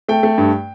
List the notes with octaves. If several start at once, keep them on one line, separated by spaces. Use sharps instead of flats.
A3 G5
A3
G2